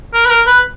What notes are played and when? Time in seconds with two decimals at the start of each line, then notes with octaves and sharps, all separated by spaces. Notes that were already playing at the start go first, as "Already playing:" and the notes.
0.14 A#4
0.25 B4
0.30 A#4
0.46 B4